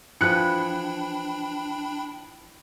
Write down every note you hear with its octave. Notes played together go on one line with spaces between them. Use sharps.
E3 F3 D4 B4 G5 B5 F#6 C#7